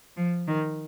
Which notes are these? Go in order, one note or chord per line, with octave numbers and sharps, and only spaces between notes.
F3
D#3